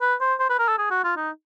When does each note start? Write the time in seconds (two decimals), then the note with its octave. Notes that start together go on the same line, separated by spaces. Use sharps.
0.01 B4
0.21 C5
0.39 C5
0.50 B4
0.59 A#4
0.68 A4
0.78 G#4
0.91 F#4
1.04 F4
1.16 D#4